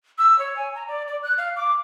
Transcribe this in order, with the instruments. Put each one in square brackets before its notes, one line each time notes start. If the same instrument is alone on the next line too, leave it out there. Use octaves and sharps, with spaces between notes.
[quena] E6
C#5
G#5
A#5
D5
D5
F#6
F5
D6